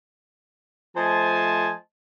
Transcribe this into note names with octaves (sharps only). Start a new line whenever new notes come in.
F3 A3 C5 D#5 G#5 A5